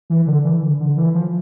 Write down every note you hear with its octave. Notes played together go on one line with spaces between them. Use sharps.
E3
D3
E3
D3
D3
E3
F3